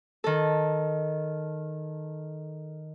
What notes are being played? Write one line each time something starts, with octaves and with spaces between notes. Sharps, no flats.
D#3 A4